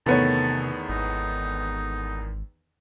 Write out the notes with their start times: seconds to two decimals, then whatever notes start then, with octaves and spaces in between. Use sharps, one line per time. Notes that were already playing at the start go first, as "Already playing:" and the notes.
0.06 E2 C3 D#3 A3 B3 C#5 A5
0.89 G#1 D#4